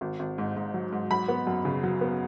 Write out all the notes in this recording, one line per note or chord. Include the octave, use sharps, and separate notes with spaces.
G#1
G#1
G#2
G#2
F#3
G#2
F#3 B5
B3
F#2
C#3
F#3
B3